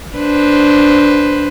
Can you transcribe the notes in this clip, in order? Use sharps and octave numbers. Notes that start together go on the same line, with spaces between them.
D4 B4 C5